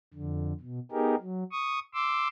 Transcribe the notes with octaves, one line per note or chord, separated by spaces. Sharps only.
F2 D3
B2
B3 D#4 G4 G#4 A#4
F#3
C#6 D#6
C6 D6 E6